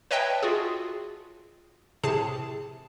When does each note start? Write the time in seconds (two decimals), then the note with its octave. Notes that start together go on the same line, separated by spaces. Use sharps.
0.11 B4 C#5 D#5 E5 G5 A5
0.42 F4 F#4 G#4
2.04 A2 C3 G#4 A5